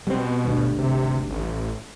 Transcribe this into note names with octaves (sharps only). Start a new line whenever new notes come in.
B2 G3 G#3 C4
G#1 D2 G2
C3
A1